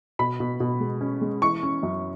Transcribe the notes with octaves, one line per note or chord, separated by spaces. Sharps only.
B2 B5
B2
B2
G#3
C#4
G#3
E3 C#6
C#4
F#2